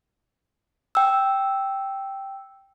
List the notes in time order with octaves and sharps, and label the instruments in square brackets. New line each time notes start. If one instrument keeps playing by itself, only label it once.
[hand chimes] G5 E6